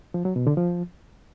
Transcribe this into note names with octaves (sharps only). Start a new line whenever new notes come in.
F3
F#3
B2
D3
F3